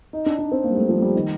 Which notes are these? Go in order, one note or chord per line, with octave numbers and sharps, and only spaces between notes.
D#4
D4
D4
C4
A#3
G3
A3
F3
A3
G3
D#3